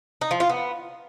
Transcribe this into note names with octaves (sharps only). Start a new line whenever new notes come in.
D#4
F3
F4
B3